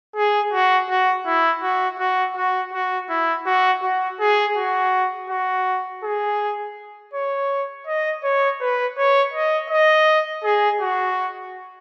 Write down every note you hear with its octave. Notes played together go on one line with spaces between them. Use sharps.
G#4
F#4
F#4
E4
F#4
F#4
F#4
F#4
E4
F#4
F#4
G#4
F#4
F#4
G#4
C#5
D#5
C#5
B4
C#5
D#5
D#5
G#4
F#4